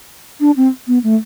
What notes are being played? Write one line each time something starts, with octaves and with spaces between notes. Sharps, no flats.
D4
C4
B3
A3